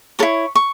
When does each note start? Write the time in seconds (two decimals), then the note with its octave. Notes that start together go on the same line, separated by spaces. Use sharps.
0.19 A4 C#5 C#6
0.23 E4
0.55 C#6